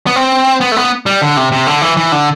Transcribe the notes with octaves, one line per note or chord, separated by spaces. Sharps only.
B3
C4
B3
A3
B3
G3
D3
C3
C3
D3
E3
E3
D3